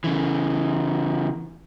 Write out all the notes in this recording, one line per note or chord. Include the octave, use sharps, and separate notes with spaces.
C#3 E3